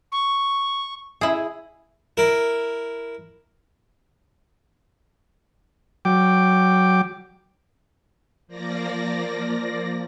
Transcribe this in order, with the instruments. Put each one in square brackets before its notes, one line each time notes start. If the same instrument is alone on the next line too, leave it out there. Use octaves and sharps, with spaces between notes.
[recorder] C#6
[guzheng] E4 G#4
[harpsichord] E4 A#4
[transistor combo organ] F#3 G5 D6
[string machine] F3 A#3 D5 A#6